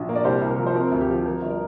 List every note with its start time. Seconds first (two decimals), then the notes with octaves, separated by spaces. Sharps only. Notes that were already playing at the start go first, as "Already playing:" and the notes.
Already playing: A#1 D4
0.09 A#3
0.15 D5
0.25 C2 G4 C5
0.42 C2
0.50 A#4
0.59 F3
0.67 C5
0.75 C4 A#4
0.92 D2
1.01 G4
1.09 F3
1.26 F3 A#4
1.42 G1
1.50 A#4